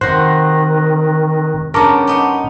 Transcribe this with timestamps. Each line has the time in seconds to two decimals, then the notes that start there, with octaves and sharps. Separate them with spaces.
0.01 C3 D#3 F#4 C5 F#6 A#6
1.74 G2 C#3 B3 A#4 A5 C#6 D6
2.07 B3 D#4